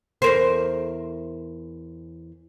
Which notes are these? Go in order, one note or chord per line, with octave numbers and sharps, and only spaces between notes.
E2 A#4 C5